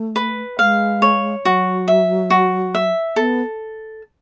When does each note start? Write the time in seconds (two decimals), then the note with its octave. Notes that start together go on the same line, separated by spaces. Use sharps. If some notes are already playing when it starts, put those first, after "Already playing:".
Already playing: A3
0.16 B4
0.58 G#3 F5
1.02 C#5
1.44 F#3 F#4
1.88 E5
2.30 F#4
2.75 E5
3.16 B3 A4